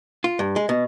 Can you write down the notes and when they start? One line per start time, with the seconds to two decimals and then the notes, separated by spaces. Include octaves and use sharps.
0.24 F4
0.39 G2
0.56 G#3
0.69 B2